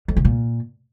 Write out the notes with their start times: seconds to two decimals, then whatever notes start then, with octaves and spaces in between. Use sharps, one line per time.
0.08 F2
0.17 C#3
0.25 A#2